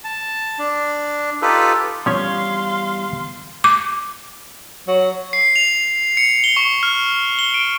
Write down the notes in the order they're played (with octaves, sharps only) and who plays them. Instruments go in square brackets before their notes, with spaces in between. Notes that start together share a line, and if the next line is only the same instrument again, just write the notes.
[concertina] A5
D4
D#4 F4 G4 A4 B4
[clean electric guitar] E2 G3 C#5 [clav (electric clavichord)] F3 C#4 [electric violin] F5 C6
[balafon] D6
[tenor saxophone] F#3
[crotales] C7
F7
C#7
G7
C#6
F6
G7
D7